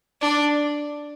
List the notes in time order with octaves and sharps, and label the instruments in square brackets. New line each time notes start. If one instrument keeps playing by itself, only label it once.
[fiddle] D4